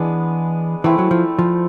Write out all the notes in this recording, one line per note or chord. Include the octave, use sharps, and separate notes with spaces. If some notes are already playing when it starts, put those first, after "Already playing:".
Already playing: E3 G#3 B3 D4
E3 A3 C4 E4
F#3
F3
F3